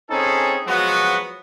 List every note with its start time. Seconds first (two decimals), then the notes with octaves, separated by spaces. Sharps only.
0.10 C4 C#4 D#4 G#4 A4
0.66 F3 F#3 G#3 B3 F#4